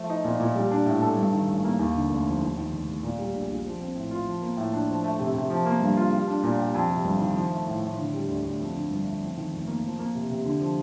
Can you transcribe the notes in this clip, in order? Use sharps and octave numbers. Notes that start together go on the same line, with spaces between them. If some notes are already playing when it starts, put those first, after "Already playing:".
Already playing: F3 A3
D#4
A#2
A#2
G3
D4
A2
A4
G2
D#3
A1
A#3
D#2
D3
F1
F3
D#2
D#3
F1
F1
A#2
G3
A#1
A#1
F3
C4
A2
F4
F3
A#3
A2
D4
F3
A3
C3
C3
F3
A#3
G2
F4
G3
D4
A#2
G4
F2
C3
G1
D#3
F3
A3
A2
A2
D3
G3
D2
D2
F2
D3
G1
A3
F2
D#3
F1
A#3
F3
A#3
C3
C3
D3
F3